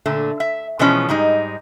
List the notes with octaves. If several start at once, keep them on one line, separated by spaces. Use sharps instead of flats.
A#2 D3 A3
E5
B2 E3 F3 G#3 B3 C#4
G#2 G3 G#3 D#4